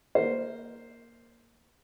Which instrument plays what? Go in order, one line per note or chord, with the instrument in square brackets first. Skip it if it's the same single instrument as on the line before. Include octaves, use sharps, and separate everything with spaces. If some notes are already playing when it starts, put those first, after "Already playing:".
[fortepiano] A#3 C5